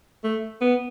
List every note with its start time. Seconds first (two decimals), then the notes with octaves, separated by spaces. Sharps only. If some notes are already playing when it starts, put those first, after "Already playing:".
0.24 A3
0.61 B3